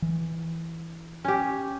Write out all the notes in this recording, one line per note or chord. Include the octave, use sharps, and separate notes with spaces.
E3
C#4 G4